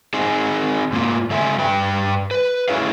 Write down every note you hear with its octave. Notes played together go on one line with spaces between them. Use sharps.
C4 D#4 G#4
G#2 A#3 F4
C#3 G#3 A4 E5 G#5
G2 B4 G5
B4
A3 C#4 E4 G#4 C#5 F5